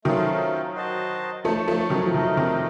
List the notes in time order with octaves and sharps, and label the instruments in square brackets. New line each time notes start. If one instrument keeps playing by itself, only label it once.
[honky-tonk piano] D#3 F#3 [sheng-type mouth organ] A3 C#4 F4 A4 C5
[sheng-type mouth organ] F#4 C5 D#5 A5
[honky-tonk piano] F3 A3 [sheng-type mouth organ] D#4 A4 C#5 A5
[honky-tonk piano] F3 A3
D#3 F#3
F3
[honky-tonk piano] D#3 F#3 [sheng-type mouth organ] A3 D#4 A#4 D#5
[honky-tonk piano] C3 D#3